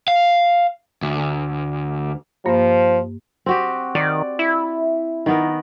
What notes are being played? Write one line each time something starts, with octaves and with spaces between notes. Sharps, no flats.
F5
D2
G2 F3 A#3
C4 F#4 G4
D#3 D5
E4
D#3 B3 A#4